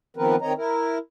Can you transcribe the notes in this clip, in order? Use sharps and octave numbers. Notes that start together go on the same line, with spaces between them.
D#3 F3 B3 C4 A#4 B4
D#3 C4 C#5 D#5 A#5
E4 A#4